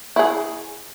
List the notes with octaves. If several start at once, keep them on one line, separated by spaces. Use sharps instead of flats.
E4 G#4